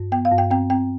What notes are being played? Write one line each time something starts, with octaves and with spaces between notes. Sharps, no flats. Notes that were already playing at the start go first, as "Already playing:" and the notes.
Already playing: G2
B3 G5
F5
G2
G5
C4 G5
C4 G5